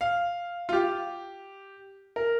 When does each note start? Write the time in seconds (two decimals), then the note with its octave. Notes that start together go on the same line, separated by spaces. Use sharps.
0.01 F5
0.69 F4
0.73 G4
2.16 A#4